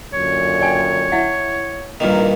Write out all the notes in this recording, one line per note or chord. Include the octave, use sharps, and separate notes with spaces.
F#2 A#2 D3 C#5
D5 G5 G#5
E4 E5 F#5
A1 G2 A#2 D#3 A#4